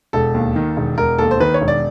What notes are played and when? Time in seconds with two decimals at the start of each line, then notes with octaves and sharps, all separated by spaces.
0.13 E1 A4
0.35 D#2
0.56 D#3
0.77 E1
0.98 E1 A#4
1.18 D#2 A4
1.31 C5
1.40 D#3 B4
1.54 C#5
1.61 E1
1.68 D5